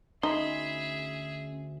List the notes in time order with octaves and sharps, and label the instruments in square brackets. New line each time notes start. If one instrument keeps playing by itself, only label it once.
[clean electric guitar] D2 B5 C6 [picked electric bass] C#4 [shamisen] D#4 [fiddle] G#4 E5